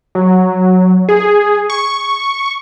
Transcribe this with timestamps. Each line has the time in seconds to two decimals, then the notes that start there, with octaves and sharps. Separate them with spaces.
0.15 F#3
1.09 G#4
1.70 C#6